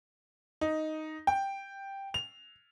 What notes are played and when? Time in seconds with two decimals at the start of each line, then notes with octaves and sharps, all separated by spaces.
0.61 D#4
1.27 G5
2.14 F7